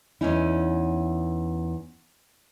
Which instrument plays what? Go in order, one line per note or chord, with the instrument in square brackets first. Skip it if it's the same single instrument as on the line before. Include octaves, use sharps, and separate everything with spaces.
[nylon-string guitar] E2 G2 B3 C#4 D#4 E4